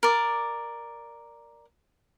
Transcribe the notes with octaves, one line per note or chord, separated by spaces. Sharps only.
A#4 D5